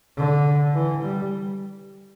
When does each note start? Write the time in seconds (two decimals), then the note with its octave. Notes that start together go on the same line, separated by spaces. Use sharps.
0.17 D3
0.75 E3
1.03 G3